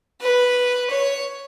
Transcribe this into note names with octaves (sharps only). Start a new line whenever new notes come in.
B4
C#5